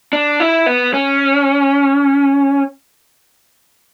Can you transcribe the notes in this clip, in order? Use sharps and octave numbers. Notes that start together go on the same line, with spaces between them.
D4
E4
B3
C#4